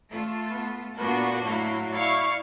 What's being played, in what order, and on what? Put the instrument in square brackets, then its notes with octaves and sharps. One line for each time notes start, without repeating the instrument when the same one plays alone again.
[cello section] A3 F4 A4
[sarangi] B3
[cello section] A#2 F4 [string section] A#3 D4 F#4 [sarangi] B3
[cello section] A2 E4 F5 [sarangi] F#3
[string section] E4 F5 C#6 [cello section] D5